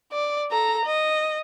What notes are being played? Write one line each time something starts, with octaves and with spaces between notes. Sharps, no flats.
D5
A4 A#5
D#5